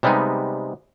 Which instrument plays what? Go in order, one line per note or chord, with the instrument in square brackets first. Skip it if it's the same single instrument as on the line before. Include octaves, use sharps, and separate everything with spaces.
[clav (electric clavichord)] C3 G3 G#3 B3 D#4